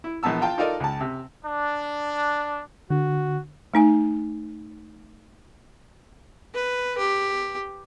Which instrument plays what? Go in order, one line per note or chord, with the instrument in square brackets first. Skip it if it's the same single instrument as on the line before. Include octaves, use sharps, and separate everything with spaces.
[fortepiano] E4
A#1 E3 B3 A5 E6
F4 G5 A5
D#4 F4 A4 A#4 D5 D#5
C#2 A5
C3
[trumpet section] D4
[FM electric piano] D3 [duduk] F#4
[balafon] A3 D#4 G#5
[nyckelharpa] B4
G4